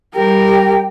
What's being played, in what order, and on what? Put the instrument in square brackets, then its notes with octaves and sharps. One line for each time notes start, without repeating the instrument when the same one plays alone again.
[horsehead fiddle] G3 A#4 [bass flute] G4 [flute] G5